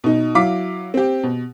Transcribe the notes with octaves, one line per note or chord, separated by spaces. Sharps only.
B2 D#4
F#3 E4 F5 D6 B6
C4 G4
B2